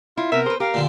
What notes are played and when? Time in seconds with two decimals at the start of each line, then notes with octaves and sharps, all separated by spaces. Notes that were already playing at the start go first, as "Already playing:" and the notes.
0.17 E4 F4
0.32 C3 B3 A#4 E5
0.46 G#4 B4 C5
0.60 G4 A#4 F5
0.74 A#2 D3 F3